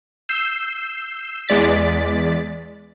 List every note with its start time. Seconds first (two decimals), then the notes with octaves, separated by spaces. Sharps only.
0.29 E6 G6 C7 E7
1.48 E2 G#3 D5 A6 B6